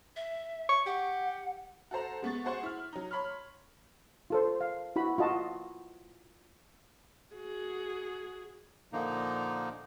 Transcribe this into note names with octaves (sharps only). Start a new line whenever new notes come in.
E5
C#6
G4 F#5
F#4 A4 C5 A#5
G#3 B3 C#6 A6
F#4 G#4 C5 F#5 C6 C#6
E4 F6
F#3 D#4
C#5 B5 C6 F6
F4 A4 C5
F5
E4 F#4 B5
F4 F#4 D#5 A5
F#4 G#4
A#2 D3 F3 A#3 D#4